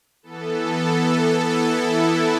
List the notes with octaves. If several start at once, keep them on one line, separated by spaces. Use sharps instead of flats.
E3 B3 A4
E4